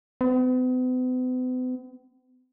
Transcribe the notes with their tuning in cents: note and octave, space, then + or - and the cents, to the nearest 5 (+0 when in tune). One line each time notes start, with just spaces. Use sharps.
B3 +45